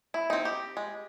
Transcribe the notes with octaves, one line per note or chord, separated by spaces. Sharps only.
E4
C4 D#4
G4
G#3